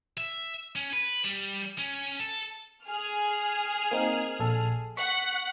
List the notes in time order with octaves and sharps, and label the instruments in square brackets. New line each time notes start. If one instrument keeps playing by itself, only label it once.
[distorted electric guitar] E5
C#4
B4
G3
C#4
A4
[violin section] G#4 F6
[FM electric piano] A#3 C4 D#4
A#1 A4
[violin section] F#5 [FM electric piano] C#6 B6